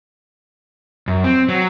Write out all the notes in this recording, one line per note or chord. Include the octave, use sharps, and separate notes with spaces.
F#2
C4
F#3